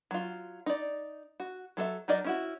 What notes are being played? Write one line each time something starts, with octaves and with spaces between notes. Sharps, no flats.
F#3 F4
D#4 D5
F#4
F#3 A4 A#4 E5
F#3 D#4 A#4 D5 D#5
C#4 E4 F#4